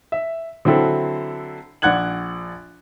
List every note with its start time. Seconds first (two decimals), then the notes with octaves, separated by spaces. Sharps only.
0.12 E5
0.65 D3 F#3 C4 E4 A4
1.82 A#1 D5 F#5 F#6 G#6 F#7